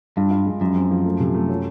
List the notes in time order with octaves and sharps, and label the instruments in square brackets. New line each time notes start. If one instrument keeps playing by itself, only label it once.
[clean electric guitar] G2 [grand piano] F4
[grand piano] F4
G#3
[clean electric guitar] F#2 [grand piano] F3
[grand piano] C4
F3
A3
C3
A3
F#3